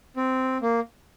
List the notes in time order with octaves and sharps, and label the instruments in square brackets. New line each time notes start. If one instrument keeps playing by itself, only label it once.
[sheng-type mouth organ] C4
A#3